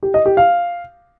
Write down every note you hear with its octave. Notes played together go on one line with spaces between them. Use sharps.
G4
D#5
G4
F5